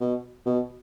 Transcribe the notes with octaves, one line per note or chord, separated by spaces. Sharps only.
B2
B2